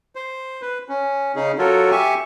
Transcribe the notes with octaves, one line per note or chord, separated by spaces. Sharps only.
C5
B4
C#4
C#3 C#4 D#4 G#4
F#3 F4 F#4 A4 A#4 C#5
G4 E5 G#5 C#6